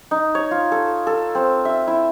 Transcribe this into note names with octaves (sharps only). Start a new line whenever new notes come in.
D#4
C#5
F4
A4
A4
C4
E5
E4